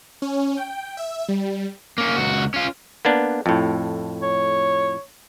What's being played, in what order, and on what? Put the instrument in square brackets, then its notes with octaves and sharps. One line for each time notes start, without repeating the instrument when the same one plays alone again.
[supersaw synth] C#4
G5
E5
G3
[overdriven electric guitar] A#3 C#4
C#2 F#4
C#4 F4
[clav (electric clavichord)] A#3 B3 D4
F2 A2
[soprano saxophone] C#5